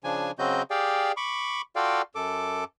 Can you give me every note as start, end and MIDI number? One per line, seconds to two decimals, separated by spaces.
0.04 0.31 49
0.04 0.31 53
0.04 0.31 62
0.04 0.31 80
0.39 0.62 49
0.39 0.62 54
0.39 0.62 60
0.39 0.62 66
0.39 0.62 75
0.39 0.62 91
0.71 1.12 67
0.71 1.12 68
0.71 1.12 74
0.71 1.12 77
0.71 1.12 79
1.17 1.61 83
1.17 1.61 85
1.17 1.61 86
1.76 2.02 65
1.76 2.02 66
1.76 2.02 69
1.76 2.02 74
1.76 2.02 77
1.76 2.02 79
2.15 2.64 42
2.15 2.64 69
2.15 2.64 86